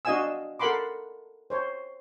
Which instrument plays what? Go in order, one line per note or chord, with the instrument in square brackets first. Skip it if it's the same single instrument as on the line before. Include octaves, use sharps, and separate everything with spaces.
[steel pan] D4 F#4 D#5 F5 G#5 E6
A4 A#4 F#5 B5 C6 D6
C5 C#5